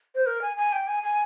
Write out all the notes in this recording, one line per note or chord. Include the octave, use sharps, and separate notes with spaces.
C5
A#4
G#5
G#5
G5
G#5
G#5